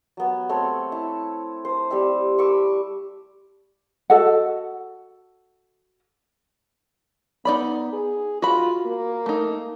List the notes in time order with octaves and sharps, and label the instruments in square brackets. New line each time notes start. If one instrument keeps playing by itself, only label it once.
[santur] F#3 B3
A3 C4 C#5
E4
C5
G3 C4 E5
B5 C#6 D6 E6
[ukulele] F#4 A4 D#5 F#5
[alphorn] B3 [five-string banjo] D#4 D5 B5
[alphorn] G#4
[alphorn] F4 [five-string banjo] F#4 B5
[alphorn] A#3
[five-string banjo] A3 D#4